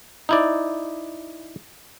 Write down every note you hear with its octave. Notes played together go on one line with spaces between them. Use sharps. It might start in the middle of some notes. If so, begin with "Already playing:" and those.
D#4 E4 D5